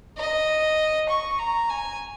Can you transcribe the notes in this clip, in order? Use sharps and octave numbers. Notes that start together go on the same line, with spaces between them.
D#5
C#6
A#5
G#5